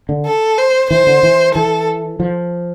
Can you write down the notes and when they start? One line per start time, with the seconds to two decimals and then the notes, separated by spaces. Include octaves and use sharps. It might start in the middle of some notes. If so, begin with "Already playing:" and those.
0.09 D3
0.26 A4
0.58 C5
0.90 E3 C5
1.07 D3
1.23 E3
1.55 E3 A4
2.20 F3